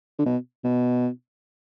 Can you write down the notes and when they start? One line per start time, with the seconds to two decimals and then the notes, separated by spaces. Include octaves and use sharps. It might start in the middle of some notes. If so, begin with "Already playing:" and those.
0.19 D3
0.26 B2
0.64 B2